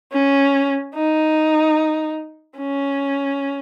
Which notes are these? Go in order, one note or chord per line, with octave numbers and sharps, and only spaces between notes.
C#4
D#4
C#4